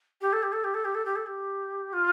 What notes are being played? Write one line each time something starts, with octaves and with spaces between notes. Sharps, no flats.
G4
A4
G4
A4
G4
A4
G4
A4
G4
A4
G4
F4